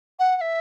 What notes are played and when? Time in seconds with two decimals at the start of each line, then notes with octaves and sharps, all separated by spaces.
0.19 F#5
0.37 F#5
0.41 E5